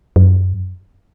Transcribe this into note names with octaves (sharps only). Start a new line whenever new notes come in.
F#2